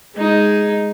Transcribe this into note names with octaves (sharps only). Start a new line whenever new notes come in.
G#3 D#4